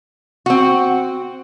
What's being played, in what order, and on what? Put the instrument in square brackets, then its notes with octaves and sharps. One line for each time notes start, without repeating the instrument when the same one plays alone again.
[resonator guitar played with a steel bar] C4 F#4